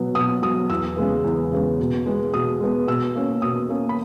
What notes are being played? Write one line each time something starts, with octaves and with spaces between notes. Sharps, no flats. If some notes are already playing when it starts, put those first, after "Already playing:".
Already playing: B2 F#3 B3
B2 D#6
F#3 B3 D#6
E2 E6
C#3 G#3 B3
E2
C#3 G#3 B3
B2
G#3 B3
B2 D#6
G#3 B3
B2 E6
A#3 C#4
B2 D#6
A#3 C#4
B5